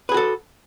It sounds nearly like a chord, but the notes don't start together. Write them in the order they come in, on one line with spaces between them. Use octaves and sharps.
B4 G#4 F#4 A4